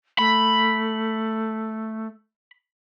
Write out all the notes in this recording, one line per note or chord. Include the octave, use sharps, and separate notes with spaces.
A3 B5